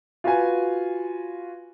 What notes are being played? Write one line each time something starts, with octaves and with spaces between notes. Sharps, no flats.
F4 F#4 B4 G#5